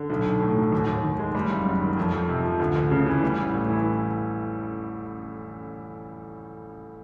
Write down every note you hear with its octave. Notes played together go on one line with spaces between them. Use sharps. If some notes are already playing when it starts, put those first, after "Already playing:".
Already playing: D3
B1
B1
A2
F#3
D#2
D#2
D#3
G#3
G3
F#1
F#2
D#3
F2
F2
C3
F3
D2
D2
C#3
E3
G3
A1
A2
E3